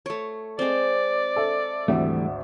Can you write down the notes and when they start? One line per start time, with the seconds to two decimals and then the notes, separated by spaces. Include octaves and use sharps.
0.06 A3 C#5
0.59 G#3 C4 D5
1.36 A4 E5
1.88 G#1 D2 E3 G3 A3 E5